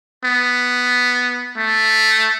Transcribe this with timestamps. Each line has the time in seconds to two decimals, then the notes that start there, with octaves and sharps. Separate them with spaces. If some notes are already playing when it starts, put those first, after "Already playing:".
0.24 B3
1.57 A3